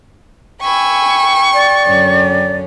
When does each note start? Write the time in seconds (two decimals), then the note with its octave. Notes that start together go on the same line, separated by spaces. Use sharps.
0.62 G5 G#5 B5 C#6 E6
1.54 D5
1.85 F#2 D3 C#4